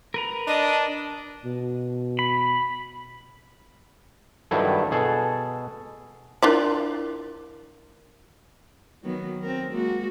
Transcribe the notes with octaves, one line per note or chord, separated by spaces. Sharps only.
A#4 B4 A#5
D4 D#5
B2
B5
G2 D#3 F#3 E4 A4
B2 G#4 A4
D4 E4 F4 A#4 D5
D#3 F#3 B3
C4 A#4
G#3 A#3 F#4